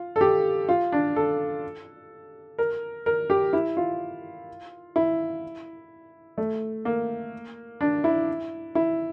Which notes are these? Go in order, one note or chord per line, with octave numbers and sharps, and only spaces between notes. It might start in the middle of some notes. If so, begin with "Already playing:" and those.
Already playing: F4
A4
G4
F4
D4
A4
A#4
A#4
G4
E4
F4
E4
A3
A#3
D4
E4
E4